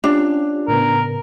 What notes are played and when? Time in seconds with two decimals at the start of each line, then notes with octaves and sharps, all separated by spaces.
0.04 C#4 D4 F4 G4
0.68 A2 C#3 B3 A#4